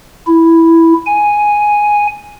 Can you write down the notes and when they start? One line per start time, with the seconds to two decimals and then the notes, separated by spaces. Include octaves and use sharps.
0.27 E4
1.06 G#5